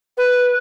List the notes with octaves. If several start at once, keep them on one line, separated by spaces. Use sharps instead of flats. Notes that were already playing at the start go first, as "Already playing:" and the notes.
B4